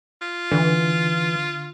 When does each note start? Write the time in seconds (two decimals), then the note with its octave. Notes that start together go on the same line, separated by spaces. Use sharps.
0.21 F4
0.51 D3 E3